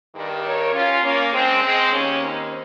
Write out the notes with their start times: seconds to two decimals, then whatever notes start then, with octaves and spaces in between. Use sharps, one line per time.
0.15 G2 D#3
0.44 A#4 C#5
0.73 C#4 F4
1.03 A#3 C#4
1.32 G#3 C4
1.62 G#3 C4
1.91 D#2 D#3 A#3 C#4
2.21 C4 D#4